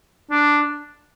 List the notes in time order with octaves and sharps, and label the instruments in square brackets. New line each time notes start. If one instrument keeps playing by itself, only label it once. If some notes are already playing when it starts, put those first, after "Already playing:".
[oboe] D4